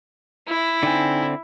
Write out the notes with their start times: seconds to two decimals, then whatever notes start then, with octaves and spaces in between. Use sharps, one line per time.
0.48 E4
0.83 D3 C4 D#4 G5 G#5